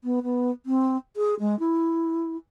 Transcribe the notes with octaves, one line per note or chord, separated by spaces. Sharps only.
B3
B3
C4
G#4
G#3
E4